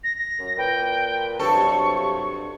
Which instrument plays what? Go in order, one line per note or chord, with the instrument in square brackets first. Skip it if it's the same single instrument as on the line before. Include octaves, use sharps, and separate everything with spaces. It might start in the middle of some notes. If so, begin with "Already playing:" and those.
[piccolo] A#6
A#6
[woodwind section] F#2
[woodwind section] A#2 B4 [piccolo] G5
[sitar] G2 A4 [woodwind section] C3 F3 F#3 [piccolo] C#6